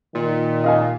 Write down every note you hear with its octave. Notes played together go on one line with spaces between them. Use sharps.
A#2 D#3
D#5 F5 G#5